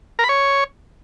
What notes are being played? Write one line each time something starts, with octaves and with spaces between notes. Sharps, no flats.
A#4
B5
C#5